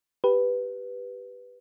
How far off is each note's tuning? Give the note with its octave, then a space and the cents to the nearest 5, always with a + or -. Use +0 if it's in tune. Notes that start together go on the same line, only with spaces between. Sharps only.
G4 +0 B4 +0